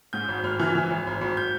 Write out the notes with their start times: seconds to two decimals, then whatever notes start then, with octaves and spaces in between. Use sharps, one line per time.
0.13 G#2 G6
0.28 G#1
0.44 G#1 F6
0.59 E3 F6
0.75 E3
0.90 G#1
1.07 G#1
1.21 G#1
1.37 G6